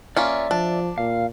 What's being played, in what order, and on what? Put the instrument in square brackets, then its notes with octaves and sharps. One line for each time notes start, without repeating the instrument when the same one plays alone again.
[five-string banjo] A#3 C#4 F4 [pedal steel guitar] D5 E5 D6
[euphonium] F3 [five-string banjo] D4
[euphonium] A#2 [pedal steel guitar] F5